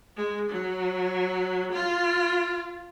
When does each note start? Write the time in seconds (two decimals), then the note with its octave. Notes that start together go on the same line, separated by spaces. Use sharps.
0.17 G#3
0.50 F#3
1.72 F4